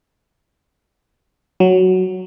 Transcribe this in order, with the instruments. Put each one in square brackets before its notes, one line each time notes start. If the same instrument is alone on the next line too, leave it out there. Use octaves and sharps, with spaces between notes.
[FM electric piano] F#3